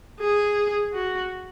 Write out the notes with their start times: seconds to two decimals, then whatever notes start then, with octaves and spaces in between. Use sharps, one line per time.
0.20 G#4
0.93 F#4